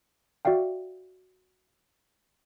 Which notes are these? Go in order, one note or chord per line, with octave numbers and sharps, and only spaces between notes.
F#4 D5 E5 F5 G5